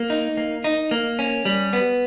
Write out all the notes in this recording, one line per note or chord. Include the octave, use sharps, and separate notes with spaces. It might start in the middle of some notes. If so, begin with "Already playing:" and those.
Already playing: A#3
D#4
A#3
D#4
A#3
C#4
G3
B3